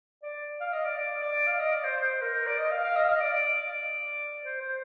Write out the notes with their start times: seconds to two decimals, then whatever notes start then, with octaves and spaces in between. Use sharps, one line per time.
0.23 D5
0.61 F5
0.73 D#5
0.85 D5
0.97 D5
1.22 D5
1.47 F5
1.59 D#5
1.72 D5
1.84 C5
1.97 C5
2.22 A#4
2.47 D5
2.58 D#5
2.71 F5
2.83 F5
2.96 D#5
3.04 F5
3.09 D#5
3.21 D5
3.33 D5
4.45 C5
4.61 C5